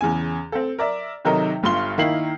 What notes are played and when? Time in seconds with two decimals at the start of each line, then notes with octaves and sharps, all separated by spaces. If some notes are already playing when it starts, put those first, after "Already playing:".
0.01 E2 C#3 G#5
0.52 C4 A4
0.78 A#4 D5 E5
1.25 C3 D#3 F#3 D#4 A4 A#4
1.63 G1 G2 F4 C6 G7
1.98 D#3 A#3 D#4 E4 C7 F#7